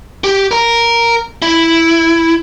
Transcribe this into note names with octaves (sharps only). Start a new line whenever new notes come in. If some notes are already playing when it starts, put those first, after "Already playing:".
G4
A#4 A#5
E4